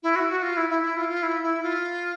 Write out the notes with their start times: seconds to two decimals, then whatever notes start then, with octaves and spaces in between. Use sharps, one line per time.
0.03 E4
0.16 F#4
0.29 F#4
0.43 F4
0.57 E4
0.69 E4
0.82 E4
0.97 F4
1.09 F4
1.23 E4
1.43 E4
1.63 F4